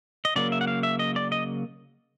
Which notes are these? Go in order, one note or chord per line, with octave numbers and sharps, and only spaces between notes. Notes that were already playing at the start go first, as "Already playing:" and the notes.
D#5
C#3 F#3 A#3 D5
E5
F#5
F5
E5
D#5
D5
D#5